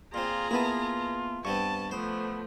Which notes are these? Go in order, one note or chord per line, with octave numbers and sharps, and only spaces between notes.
A#2 C4 F4 G#4 A#5
A#3 B3 E4 F4 B4 A5
G2 B3 C4 A5 C#6
F3 A3 B3 C5